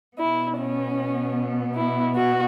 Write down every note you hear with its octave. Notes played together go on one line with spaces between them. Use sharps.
B2 B3 E4
C#4
E4
F#4